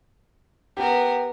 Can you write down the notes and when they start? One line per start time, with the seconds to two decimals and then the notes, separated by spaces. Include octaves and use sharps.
0.77 B3 G4 A#4